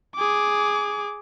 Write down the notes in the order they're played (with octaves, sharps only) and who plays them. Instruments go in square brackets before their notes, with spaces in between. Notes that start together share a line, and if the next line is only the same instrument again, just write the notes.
[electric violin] G#4 D6